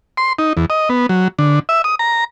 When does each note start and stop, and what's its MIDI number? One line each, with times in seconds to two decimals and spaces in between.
0.17 0.33 84
0.39 0.53 63
0.57 0.66 40
0.70 0.89 75
0.89 1.06 59
1.09 1.28 54
1.39 1.59 50
1.69 1.82 76
1.84 1.95 87
1.99 2.24 82